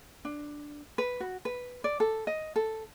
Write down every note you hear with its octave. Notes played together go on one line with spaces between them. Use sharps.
D4
B4
F#4
B4
D5
A4
D#5
A4